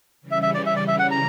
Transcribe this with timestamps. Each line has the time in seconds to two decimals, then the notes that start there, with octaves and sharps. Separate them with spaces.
0.21 C#3 E3 G3 C#4
0.31 E5
0.42 E5
0.54 D5
0.66 E5
0.76 D5
0.88 E5
0.99 F#5
1.11 A#5